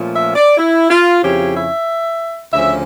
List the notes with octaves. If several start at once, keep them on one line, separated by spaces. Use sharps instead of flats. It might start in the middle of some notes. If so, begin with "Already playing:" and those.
Already playing: A#2 F3 A3 C#4
E5
D5
E4
F4
F2 C#3 F3 C#4 E4 G4
E5
D2 C#3 F3 C#4 E5